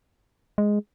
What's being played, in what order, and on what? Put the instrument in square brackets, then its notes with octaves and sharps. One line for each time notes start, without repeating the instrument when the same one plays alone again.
[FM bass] G#3